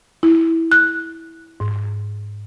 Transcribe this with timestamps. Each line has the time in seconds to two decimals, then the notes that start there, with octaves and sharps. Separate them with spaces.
0.23 E4
0.72 F#6
1.60 G#2